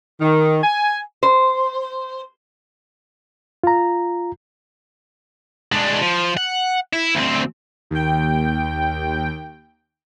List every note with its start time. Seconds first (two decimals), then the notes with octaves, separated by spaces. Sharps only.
0.20 D#3
0.62 G#5
1.23 C5
3.64 F4 A#5
5.72 G#3 D4
6.01 F3
6.37 F#5
6.93 E4
7.15 D2 C4
7.91 D#2 G5